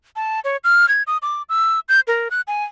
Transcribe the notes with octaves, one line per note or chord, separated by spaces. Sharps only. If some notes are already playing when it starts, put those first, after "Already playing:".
A5
C#5
F6
G#6
D#6
D6
E6
G6
A#4
F#6
G#5